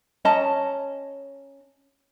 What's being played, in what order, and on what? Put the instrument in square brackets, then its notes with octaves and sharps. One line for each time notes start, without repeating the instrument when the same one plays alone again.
[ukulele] C#4 D#5 A5 A#5